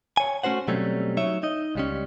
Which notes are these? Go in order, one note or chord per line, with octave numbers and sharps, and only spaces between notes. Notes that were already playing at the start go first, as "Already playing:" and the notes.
C#5 G#5
A3 C#4 F#4 C5 F#5
B2 F#3 G3 A3 C4 C#4
F#3 D#4 C#5 E5
D#4 D#5
C#2 G3 C#4